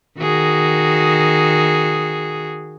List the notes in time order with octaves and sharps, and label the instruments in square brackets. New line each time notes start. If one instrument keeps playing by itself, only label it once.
[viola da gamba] D#3 F#4 G#4